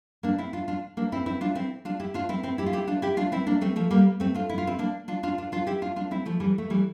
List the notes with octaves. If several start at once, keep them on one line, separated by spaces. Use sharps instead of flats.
A#3 D4
C4 E4
D4 F4
D4 F4
A#3 D4
C4 E4
C4 E4
D4 F4
C4 E4
D4 F4
E4 G4
D4 F4
C4 E4
C4 E4
E4 G4
F4
E4 G4
D4 F4
E4 G4
D4 F4
C4 E4
A#3 D4
A3 C4
F3 A3
G3 A#3
A3 C4
D4 F4
E4
F4
C4 E4
A#3 D4
D4 F4
D4 F4
D4 F4
D4 F4
E4 G4
D4 F4
D4 F4
C4 E4
F3 A3
E3 G3
A3
E3 G3